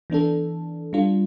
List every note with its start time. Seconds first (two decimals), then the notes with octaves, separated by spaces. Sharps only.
0.10 E3 B3 D4 A4
0.93 G3 D4 F4